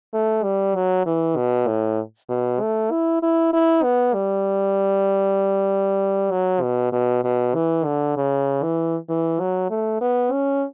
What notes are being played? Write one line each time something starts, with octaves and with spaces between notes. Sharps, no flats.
A3
G3
F#3
E3
B2
A2
B2
A3
E4
E4
E4
B3
G3
F#3
B2
B2
B2
E3
D3
C#3
E3
E3
F#3
A3
B3
C#4